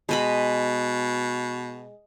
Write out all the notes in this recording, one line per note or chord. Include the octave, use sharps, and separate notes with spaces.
B2 G#3 D#5 B5